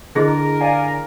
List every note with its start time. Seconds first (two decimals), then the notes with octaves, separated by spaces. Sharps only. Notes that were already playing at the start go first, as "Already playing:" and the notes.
0.15 D3 E4 G#4 A#4 D#5
0.61 D5 F5 G#5